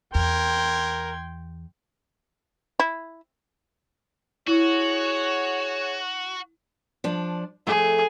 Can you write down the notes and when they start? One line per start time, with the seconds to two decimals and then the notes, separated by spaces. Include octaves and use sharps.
0.15 E2 A#4 G5 C6 G#6
2.80 E4
4.48 E4 F#4 G#4 C#5
7.04 F3 D4
7.67 F2 A3 G#4